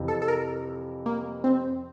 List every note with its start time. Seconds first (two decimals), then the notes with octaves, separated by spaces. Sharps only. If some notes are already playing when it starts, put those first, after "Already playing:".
Already playing: F2 C3 E3
0.08 A4
0.22 A4
0.28 A#4
1.06 A#3
1.44 C4